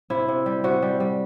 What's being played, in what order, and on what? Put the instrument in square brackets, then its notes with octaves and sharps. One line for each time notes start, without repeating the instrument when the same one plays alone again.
[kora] C3 E4
C3
G3
C3 F#4
G3
G3